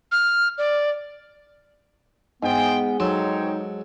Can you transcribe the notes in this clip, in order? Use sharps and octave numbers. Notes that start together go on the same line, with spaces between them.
F6
D5
G#2 B3 G#4 C5 G5
F#3 D#4 A4 C5 C#5 G5 C6